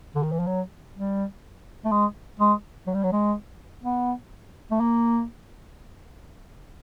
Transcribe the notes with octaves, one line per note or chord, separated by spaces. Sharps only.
D3
D#3
E3
F3
F#3
G3
A3
G#3
G#3
F#3
G3
F#3
G#3
B3
A3
A#3